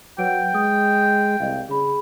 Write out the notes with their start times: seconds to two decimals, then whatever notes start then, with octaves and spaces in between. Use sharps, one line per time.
0.18 F#3 B4 F#5 G5 D7
0.54 G#3 D#6
1.02 G6
1.40 C2 D#5 F5
1.69 C#3 G#4 B5